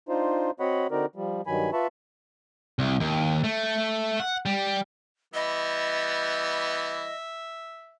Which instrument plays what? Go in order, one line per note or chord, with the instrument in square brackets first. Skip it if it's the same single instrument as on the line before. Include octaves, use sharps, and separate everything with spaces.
[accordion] D4 D#4 F4 C5
C4 F#4 C#5 D#5 F#5 B5
D3 C4 D#4 F#4 A#4 D5
F3 G3
G2 D#3 F#3 G#5 B5
F4 B4 E5 A5 B5 C#6
[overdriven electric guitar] C2
D#2
A3
F#5
G3
[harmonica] E3 G3 B3 [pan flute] D#5 [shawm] E5